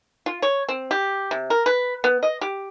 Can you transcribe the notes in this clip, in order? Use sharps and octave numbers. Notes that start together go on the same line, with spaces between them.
F4
C#5
C4
G4
C3
A#4
B4
B3
D#5
G4